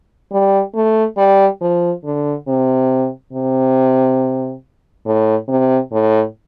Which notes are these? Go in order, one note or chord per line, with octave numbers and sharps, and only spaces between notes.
G3
A3
G3
F3
D3
C3
C3
A2
C3
A2